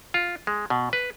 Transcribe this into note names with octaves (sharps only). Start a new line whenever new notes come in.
F4
G#3
B2
B4